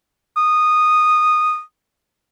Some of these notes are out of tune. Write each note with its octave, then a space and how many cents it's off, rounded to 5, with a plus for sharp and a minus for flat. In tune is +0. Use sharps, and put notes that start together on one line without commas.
D#6 -10